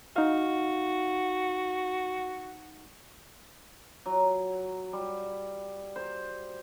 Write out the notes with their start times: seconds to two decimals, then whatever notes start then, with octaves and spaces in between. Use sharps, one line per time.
0.16 D#4 F#4 F5
4.06 F#3
4.93 G3
5.96 C5